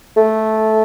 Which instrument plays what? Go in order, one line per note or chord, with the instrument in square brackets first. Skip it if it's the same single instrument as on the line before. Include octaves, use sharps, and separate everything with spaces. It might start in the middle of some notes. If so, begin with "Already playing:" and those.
[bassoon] A3